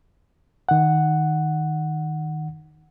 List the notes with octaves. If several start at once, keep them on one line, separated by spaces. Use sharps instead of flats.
D#3 F#5